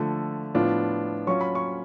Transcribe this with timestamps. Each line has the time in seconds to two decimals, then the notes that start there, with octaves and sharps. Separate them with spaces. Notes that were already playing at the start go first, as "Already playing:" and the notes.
Already playing: D3 F3 A3
0.54 A2 F3 B3 D4 F4
1.27 F#3 C#4 F4 C#6
1.41 B5
1.55 C#6